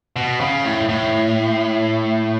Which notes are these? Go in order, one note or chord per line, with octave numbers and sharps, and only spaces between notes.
B2
C#3
A2
A2